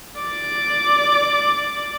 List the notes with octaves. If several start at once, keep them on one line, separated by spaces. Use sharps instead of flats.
D5 D6